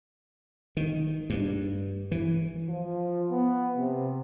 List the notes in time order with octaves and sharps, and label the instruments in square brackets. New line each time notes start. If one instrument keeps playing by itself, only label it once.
[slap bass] D#3
G2
E3
[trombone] F3
B3
C3